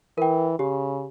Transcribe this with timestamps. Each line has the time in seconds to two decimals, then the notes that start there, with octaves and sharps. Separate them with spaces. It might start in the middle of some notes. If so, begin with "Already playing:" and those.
0.18 E3 A#4 G5
0.59 C#3 G4